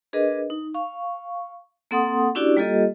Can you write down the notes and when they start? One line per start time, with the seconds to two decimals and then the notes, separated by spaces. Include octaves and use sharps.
0.13 D4 G#4 A#4 B4 D#5
0.50 D#4
0.74 F5 C#6
1.91 A#3 C4 A4 F#5 C6 D#6
2.35 C#4 D4 E4 F#4 G4 D5
2.57 G3 A#3 F4 G4 A4 D#5